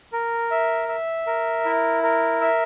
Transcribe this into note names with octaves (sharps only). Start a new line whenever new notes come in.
A#4
E5
E5
A#4
E4
A#4
E5